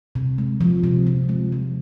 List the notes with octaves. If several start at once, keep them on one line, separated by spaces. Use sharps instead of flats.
C3
G#3
F3
C3
C3
G#3
F3